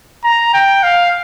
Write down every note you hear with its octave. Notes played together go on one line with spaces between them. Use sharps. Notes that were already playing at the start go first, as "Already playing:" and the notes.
A#5
G5
F5